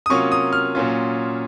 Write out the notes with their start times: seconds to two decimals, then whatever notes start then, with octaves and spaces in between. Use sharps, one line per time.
0.06 D#6
0.10 C3 F#3 A#3 C#4 F4 C#6
0.32 D#6
0.53 F6
0.75 A#2 F#3 C#4 F4